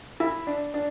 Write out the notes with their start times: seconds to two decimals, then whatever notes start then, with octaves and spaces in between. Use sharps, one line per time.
0.20 E4
0.47 D4
0.74 D4